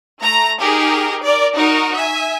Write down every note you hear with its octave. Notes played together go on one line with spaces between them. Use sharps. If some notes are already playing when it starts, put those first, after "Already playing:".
A3 A#5
D#4 G4 G#4 A#4
A#4 D5
D#4 F#4 A#4
E5 G#5